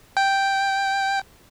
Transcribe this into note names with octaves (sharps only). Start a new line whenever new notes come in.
G5